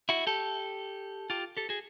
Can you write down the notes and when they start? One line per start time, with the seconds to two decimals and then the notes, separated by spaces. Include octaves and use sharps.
0.09 E4 F#4
0.27 G4 A4
1.30 F4 G4
1.57 G4 A4
1.69 F#4 G#4